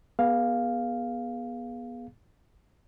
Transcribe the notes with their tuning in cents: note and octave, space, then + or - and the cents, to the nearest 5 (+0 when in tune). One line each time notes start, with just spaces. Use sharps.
B3 -25 G#4 +0 F5 +0